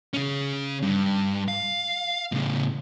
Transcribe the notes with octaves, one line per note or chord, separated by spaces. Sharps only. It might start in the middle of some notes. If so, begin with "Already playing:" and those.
C#3 C#4
G2
F5
A2 C#3